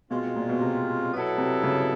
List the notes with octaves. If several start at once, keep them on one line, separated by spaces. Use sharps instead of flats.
B2 G#3 C4 F4
B2
A#2
B2
C3
B2 F#3 B3 E4 A4
C3
C#3